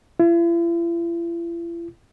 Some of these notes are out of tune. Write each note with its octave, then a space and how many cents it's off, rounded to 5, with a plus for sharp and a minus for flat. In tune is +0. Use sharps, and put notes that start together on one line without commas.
E4 +45